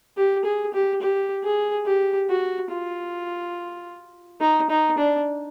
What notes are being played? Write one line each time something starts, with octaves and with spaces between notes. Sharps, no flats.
G4
G#4
G4
G4
G#4
G4
F#4
F4
D#4
D#4
D4